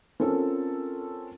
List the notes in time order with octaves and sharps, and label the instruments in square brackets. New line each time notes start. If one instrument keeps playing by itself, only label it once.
[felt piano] C4 C#4 F4 A4 A#4